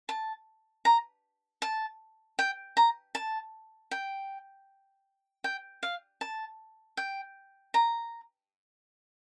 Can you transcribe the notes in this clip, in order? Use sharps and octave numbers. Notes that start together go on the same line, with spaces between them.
A5
A#5
A5
G5
A#5
A5
G5
G5
F5
A5
G5
A#5